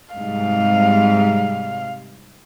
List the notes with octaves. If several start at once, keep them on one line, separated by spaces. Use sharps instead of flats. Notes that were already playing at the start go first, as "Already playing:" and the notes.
G#2 C3 G3 F5